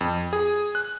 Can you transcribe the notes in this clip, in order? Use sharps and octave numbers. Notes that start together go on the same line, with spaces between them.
F2
G#4
F#6